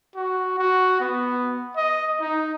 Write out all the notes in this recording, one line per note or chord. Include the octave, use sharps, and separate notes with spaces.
F#4
F#4
B3
D#5
D#4